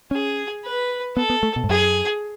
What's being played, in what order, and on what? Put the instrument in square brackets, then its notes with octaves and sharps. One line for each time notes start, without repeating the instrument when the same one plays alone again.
[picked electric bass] C#4 [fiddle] G#4
[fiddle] B4
[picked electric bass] B3 [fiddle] A4
[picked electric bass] B3
A3
B2
G#2
[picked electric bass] F#2 [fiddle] G#4